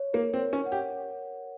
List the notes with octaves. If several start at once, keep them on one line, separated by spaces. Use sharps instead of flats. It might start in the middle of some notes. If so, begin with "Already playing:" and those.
Already playing: C#5
A#3 A#4
C4
C#5
C#4
F#5
G4